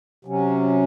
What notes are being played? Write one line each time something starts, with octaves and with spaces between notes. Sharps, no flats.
C3 F#3 C#4